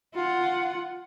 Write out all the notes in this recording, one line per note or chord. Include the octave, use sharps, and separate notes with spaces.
F4 F#5